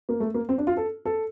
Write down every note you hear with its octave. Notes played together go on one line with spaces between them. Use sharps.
A#3
A3
A#3
C4
D4
F4
A4
A4